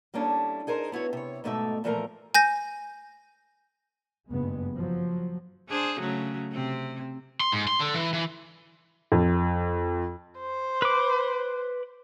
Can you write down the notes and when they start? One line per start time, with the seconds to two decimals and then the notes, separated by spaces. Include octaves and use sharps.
0.14 G3 A#3 C#4 D4 E4 A4
0.67 D#4 G#4 A#4 C5
0.92 B3 E4 F#4 C#5
1.13 C3 C#5
1.44 G#2 B2 A3 D#4 D5 E5
1.84 A#2 E3 F3 A3 A#4 A#5
2.35 G#5 G6 A#6
4.30 F#1 G2 G#3 B3
4.75 F3 F#3
5.69 D4 G#4 C5
6.00 C#3 F#3 A3
6.52 C3 C4
7.40 C6
7.52 G#2
7.68 C6
7.80 D3
7.94 E3
8.13 E3
9.12 F2
10.38 C5
10.82 B4 D6